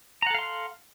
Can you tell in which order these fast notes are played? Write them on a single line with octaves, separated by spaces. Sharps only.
A#5 F#5 A4 F5 C6